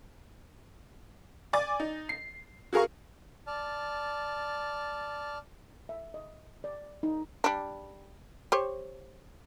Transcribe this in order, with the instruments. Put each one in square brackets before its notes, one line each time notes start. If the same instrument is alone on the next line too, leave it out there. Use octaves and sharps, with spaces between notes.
[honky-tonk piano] D5 G#5 D6 A6
D#4
C7
F#4 G#4 A#4 F5 C#6
[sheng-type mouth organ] D5 A5 F6
[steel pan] E5
D#5
D5
D#4
[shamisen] G3 D4
G4 C5 C#5